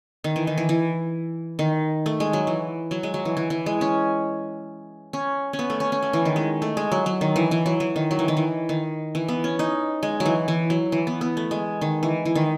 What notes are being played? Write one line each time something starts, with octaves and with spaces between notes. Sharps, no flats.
D#3
E3
D#3
E3
E3
D#3
A3
G#3
F#3
E3
F#3
G#3
F#3
E3
E3
E3
G#3
C#4
C#4
C#4
B3
A3
C#4
C#4
A3
E3
D#3
G#3
A3
G#3
F#3
F#3
D#3
E3
E3
F#3
E3
D#3
F#3
E3
D#3
E3
D#3
E3
B3
C#4
D#4
G#3
F#3
E3
E3
F#3
E3
B3
B3
A3
G#3
D#3
E3
E3
D#3